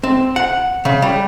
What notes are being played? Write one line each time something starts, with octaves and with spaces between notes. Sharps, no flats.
C4
F#5
C#3
G3